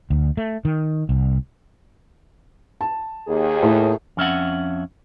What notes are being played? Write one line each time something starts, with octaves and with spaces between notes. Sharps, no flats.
D2
A3
D#3
C2
A5
D#2 G#4
A2
F2 C#4 E5 F#5